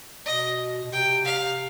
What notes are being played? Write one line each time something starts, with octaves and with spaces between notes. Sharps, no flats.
B2 D#5
B2
C3 G5
C3 F5